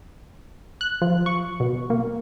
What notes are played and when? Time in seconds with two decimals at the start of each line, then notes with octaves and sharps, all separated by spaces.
0.81 F#6
1.02 F3
1.26 C#6
1.60 B2
1.90 A#3